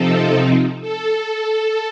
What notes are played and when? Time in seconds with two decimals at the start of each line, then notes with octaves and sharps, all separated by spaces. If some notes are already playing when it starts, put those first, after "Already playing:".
Already playing: C3 F3 C4 D#4 A4
0.81 A4